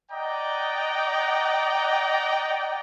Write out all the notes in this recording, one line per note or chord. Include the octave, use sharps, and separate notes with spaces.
D5 D#5 F#5 G5 A#5